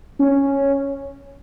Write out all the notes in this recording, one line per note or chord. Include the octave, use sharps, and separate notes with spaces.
C#4